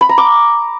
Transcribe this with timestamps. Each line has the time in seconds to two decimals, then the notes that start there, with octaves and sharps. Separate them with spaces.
0.01 B5
0.09 A#5
0.18 D6